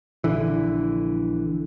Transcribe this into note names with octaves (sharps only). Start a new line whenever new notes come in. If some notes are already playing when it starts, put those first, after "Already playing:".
A#1 D3 E3